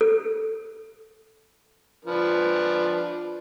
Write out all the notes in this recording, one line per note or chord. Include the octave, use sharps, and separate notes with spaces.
A4
F3 D4 B4